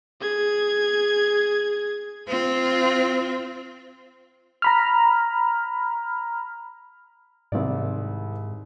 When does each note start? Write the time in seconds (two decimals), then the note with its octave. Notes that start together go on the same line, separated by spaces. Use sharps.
0.21 G#4 G#6
2.28 C4 F4
4.62 A#5 B5 F6
7.52 C2 G#2 D#3 D5